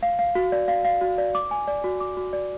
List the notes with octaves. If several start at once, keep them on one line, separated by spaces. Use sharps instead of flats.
F5
F5
F#4
D5
F5
F5
F#4
D5
D6
G#5
D5
F#4
D6
F#4
D5